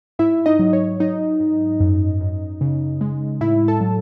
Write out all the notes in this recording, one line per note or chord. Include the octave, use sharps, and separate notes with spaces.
G#2 E4 E5
D#4 D#5
F#3
C#5
F#3 D#4 D#5
G#2
F#2
F#2
C#3
G#3
A2 E4 E5
A4 A5
F#3